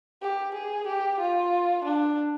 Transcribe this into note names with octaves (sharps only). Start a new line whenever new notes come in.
G4
G#4
G4
F4
D4